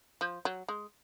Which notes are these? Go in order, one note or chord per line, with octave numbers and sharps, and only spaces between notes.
F3
F#3
G#3